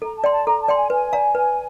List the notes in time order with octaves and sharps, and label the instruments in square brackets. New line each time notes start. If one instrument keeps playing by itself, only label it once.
[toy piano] A4 [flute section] A#5
[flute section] A5
[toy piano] D5 G5 C6
[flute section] A5
[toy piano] A4 [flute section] A#5
[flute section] A5
[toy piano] D5 G5 C6
[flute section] G#5
[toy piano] B4 [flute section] G#5
[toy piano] D5 F5 A#5
B4